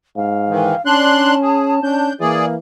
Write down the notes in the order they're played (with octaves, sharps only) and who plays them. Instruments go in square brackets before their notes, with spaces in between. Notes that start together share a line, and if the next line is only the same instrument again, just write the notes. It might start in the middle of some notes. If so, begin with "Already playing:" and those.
[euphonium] G#2 [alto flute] F5
[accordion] D#3 E3
[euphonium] C#4 [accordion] D4 C6 F#6 [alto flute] A5
[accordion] G#4
[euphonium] C#4 [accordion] D4 G6
[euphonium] E3 [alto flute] A#3 [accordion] G#4 D5